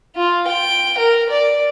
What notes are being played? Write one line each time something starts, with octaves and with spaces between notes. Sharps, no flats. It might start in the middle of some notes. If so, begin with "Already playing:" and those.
F4
G5
A#4
D5